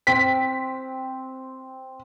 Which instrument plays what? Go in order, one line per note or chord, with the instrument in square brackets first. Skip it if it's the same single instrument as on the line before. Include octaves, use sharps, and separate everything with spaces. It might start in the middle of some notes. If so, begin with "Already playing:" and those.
[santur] C4 [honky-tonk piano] B6